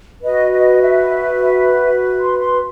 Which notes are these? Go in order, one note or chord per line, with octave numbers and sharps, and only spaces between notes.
F#4 B4 D#5
D#5
E5
C6
C6